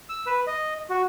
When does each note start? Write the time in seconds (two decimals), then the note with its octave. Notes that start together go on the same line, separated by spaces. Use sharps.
0.09 E6
0.26 B4
0.47 D#5
0.90 F#4